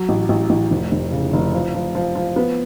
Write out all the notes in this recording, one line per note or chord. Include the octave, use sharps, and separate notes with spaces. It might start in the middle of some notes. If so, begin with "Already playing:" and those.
Already playing: F#3
A1
A1
A1
F1
F1
C#3
F1
F3
F3
F3
F3
B3